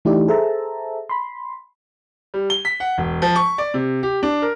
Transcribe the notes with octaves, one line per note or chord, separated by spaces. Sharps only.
E3 A3 D#4 E4 G4 D5
G#4 A4 C5 E5 A5 A#5
B5 C6
G3
G7
B6
F#5
E1
F3
C#6
D5
C3
G4
D4
A#4